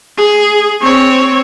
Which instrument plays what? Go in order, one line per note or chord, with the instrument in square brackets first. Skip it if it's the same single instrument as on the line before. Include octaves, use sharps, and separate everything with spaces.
[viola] G#4
C4 C#5